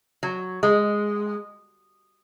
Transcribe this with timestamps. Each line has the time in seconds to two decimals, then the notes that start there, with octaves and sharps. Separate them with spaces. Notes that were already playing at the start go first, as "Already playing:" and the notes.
0.23 F#3
0.63 G#3